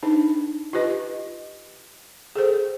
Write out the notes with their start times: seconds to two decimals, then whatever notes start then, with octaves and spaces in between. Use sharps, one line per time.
0.03 D4 D#4
0.73 F4 G4 B4 D#5
2.36 G#4 A4 C5